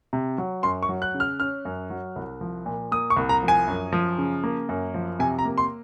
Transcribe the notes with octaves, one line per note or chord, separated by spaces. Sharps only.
C3
F#3
F#2 C6
C#6
F#3
F#6
C#3
F6
C#4 F6
F#2
F#3
C2
F3
A#2
A#3 D#6
C#6
C2
A#5
F3
G#5
F#2
F3
C#3
A#3
F#2
F3
C3 G#5
A#5
A#3
C6